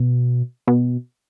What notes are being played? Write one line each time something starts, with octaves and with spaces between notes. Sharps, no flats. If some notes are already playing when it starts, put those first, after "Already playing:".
Already playing: B2
B2